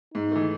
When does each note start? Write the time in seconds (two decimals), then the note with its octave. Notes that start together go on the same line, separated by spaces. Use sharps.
0.14 G#2 D#4
0.31 E3 A3